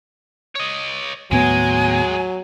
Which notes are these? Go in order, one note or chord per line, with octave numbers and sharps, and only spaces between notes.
C#5 D#5
D#2 A2 F#3 G#3 B3 G#5